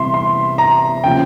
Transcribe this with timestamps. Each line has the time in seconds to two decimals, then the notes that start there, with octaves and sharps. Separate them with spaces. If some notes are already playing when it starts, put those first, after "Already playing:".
Already playing: C3 E3 G3 E5 C6
0.14 C6
0.58 A#5
1.04 C#3 F3 A#3 G5